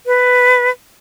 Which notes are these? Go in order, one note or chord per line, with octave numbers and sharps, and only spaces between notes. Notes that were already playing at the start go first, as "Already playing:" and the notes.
B4